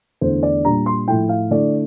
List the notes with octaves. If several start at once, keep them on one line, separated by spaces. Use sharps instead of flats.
E2 D3 A3 C5
D5
A#2 G3 D4 A#5
C6
A2 F3 A3 E4 G5
F5
D3 A3 E4 D5